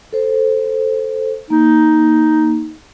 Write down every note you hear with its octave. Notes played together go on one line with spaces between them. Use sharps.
A4 C5
A#3 D#4